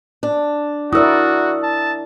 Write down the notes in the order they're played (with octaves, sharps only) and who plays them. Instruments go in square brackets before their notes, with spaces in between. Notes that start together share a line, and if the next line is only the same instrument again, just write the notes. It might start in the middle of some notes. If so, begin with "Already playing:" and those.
[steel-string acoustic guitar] D4
[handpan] E4 A#4 D5 [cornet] F#4 [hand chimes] D#6 E6
[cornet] A5